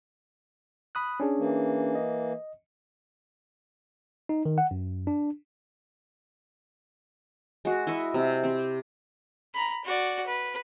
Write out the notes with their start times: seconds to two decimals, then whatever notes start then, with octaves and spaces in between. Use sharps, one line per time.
0.95 B5 D#6 F#6
1.20 C#4 D4 G#4
1.38 E3 A#3
1.95 D#5
4.29 D#4
4.45 D#3
4.58 F#5
4.71 F#2
5.07 D4
7.65 G#3 F#4
7.87 E4 D#5 E5 C#6
8.14 C3
8.43 C4 G4
9.54 A#5 B5
9.85 F#4 D5
10.26 B4